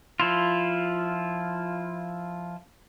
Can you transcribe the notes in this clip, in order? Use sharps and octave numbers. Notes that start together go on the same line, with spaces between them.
F3 E4 F4